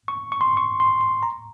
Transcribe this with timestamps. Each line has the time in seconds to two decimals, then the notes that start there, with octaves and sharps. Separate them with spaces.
0.08 C#6
0.32 C#6
0.41 C6
0.57 C#6
0.80 C6
1.01 C6
1.23 A#5